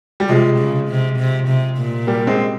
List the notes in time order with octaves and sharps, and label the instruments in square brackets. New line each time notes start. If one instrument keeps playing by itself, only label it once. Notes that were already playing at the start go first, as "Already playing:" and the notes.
[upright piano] G3
[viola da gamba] C3 [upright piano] F3 G#3
[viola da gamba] C#3
C3
C3
C3
A#2
[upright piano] G3 A#3
G#3 C4